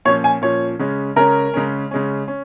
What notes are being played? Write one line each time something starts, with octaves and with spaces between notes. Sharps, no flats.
A#2 F3 C#4 C#5
G#5
A#2 F3 C#4 C#5
C#3 G#3 C#4
C#3 G#3 C#4 A#4
C#3 G#3 C#4
C#3 G#3 C#4
C#4